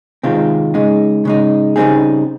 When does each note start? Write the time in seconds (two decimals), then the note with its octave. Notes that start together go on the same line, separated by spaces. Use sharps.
0.23 C3 D#3 G#3 C4 F4
0.74 C#3 G#3 D#4
1.25 C#3 G#3 D#4
1.76 C#3 G3 C4 D#4 G#4